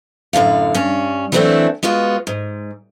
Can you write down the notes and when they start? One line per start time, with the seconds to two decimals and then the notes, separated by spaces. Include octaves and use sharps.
0.33 F#2 A2 D3 F5
0.74 G2 C#4
1.32 E3 F#3 A3 C4 D4 E4
1.83 G#3 B3 F4 F#4
2.27 G#2